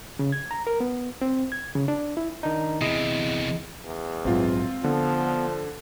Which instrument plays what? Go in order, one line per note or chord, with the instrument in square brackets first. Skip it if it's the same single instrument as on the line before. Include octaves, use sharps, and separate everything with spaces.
[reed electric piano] C#3
G#6
A#5
A#4
B3
C4
G#6
C#3
D4
E4
[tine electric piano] D#3 D4 D#4
[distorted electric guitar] E2 C3 [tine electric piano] E4 G#4 D#5
[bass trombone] E2
[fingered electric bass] A#1 G#2 F#3 [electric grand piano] C4 F4
[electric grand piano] D3 [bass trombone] F3 [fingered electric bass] B3